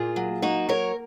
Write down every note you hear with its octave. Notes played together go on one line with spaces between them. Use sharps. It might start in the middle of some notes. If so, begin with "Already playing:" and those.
Already playing: A#2 A#3 F4 G#4
F#3
A#3 D#4 F#4
F#3 A#4 C#5